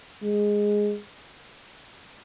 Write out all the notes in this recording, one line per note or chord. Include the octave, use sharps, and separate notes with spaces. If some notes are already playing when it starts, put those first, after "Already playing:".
G#3